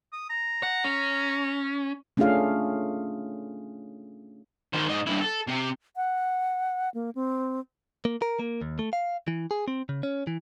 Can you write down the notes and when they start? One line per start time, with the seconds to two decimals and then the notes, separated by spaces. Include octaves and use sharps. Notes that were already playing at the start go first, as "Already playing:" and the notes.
0.13 D#6
0.30 A#5
0.63 F#5
0.84 C#4
2.17 A3 C#4 D4 F4 G#4 F5
4.73 D#3 C5
4.88 G#2 D#5
5.06 G2 E4
5.21 A4
5.48 C3
5.96 F#5
6.94 A#3
7.15 C4
8.05 A#3
8.22 A#4
8.40 A#3
8.61 D#2
8.79 A3
8.93 F5
9.28 E3
9.51 G#4
9.68 C4
9.89 C#3
10.03 C#4
10.27 E3